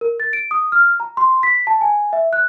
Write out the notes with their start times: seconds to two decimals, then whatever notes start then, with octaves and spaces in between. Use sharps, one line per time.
0.01 A#4
0.20 A6
0.33 D7
0.51 D#6
0.72 F6
1.00 A#5
1.17 C6
1.43 B6
1.67 A5
1.81 G#5
2.13 E5
2.33 F#6